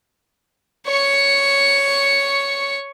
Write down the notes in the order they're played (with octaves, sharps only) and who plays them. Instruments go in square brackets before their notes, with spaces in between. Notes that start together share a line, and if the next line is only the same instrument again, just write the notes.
[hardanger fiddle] C#5 C#6